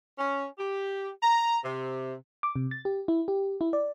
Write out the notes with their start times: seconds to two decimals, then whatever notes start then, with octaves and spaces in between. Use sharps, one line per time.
0.18 C#4
0.58 G4
1.22 A#5
1.64 C3
2.43 D6
2.56 C3
2.71 A6
2.85 G4
3.08 E4
3.28 G4
3.61 E4
3.73 D5